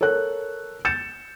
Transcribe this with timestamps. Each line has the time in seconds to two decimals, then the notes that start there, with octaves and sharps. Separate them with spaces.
0.01 A4 A#4 C#5 F#6
0.85 G6 A6 C#7 E7